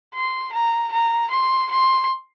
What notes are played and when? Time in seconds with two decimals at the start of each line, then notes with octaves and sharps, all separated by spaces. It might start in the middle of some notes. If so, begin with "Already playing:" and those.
0.14 C6
0.53 A#5
0.93 A#5
1.31 C6
1.71 C6